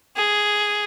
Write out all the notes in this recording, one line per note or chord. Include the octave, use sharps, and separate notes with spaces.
G#4